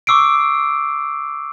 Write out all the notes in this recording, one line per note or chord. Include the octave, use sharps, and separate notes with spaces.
C#6 D6 E6 C7 D7